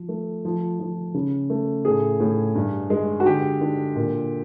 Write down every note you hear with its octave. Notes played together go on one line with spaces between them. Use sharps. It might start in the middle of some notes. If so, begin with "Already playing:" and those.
Already playing: F3
A3
F3
F3
C#3
A3
A2 G#4
A2
G2
G#3
F#4
D3 G4
D3
A#2